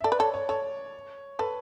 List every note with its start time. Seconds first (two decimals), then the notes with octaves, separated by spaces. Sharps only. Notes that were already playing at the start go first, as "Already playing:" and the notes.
0.01 E5
0.04 A4 D5
0.12 B4
0.19 A4 C#5
0.34 C#5
0.49 A4 C#5
1.39 A4 B4